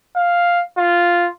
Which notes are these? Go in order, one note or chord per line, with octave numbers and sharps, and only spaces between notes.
F5
F4